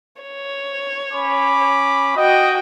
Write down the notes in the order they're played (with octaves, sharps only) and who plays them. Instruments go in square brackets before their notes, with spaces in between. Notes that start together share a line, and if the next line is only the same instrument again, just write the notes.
[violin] C#5
[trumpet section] C#4 B5 D6
[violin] F#4 G5 [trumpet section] D#5